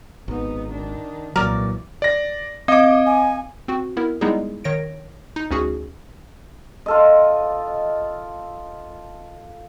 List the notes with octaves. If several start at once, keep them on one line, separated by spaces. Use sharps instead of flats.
G#1 B3 D#4
D#3 D4
C2 A#2 E3 F#3 A#4 D5
D5 A#6
C4 D#5 D6
G#5
C4 F#4
B3 E4 A#4
G3 G#3 B3 D#4 E4 G#4
D#3 C#5 A#6 D7
D#4
D2 C#4 F#4 G#4
F4 A4 D#5